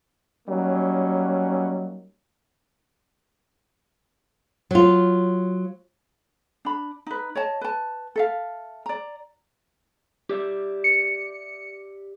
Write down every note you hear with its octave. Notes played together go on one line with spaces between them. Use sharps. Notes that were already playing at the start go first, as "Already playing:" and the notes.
F#3 G3 A#3 C#4 D#4
F#3 F4
D4 B5
D#4 B4
C#5 D#5 A5
B4 A5
A4 E5 F5
D5 A#5
G4 D5 E5
C#7